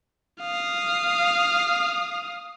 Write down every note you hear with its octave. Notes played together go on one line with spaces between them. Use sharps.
F5 D#6